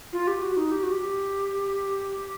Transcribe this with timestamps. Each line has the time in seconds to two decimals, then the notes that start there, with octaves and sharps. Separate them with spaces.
0.13 F4
0.27 G4
0.42 F#4
0.57 D#4
0.72 G4
0.83 F#4
0.92 G4